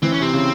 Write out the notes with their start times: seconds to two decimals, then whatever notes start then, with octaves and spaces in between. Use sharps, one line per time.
0.03 E3 C4
0.12 C#4
0.20 C3 C4
0.33 C#3